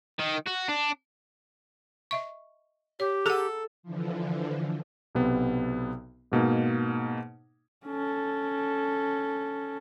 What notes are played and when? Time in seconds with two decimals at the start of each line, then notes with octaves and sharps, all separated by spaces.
0.19 D#3
0.46 F#4
0.68 D4
2.11 D#5 E5 C#6
3.00 G4 C#5
3.26 G#4 A4 F#5
3.83 D3 E3 F3
5.15 B1 C3 B3
6.32 G#2 B2 A#3 D#4
7.86 C#4 A4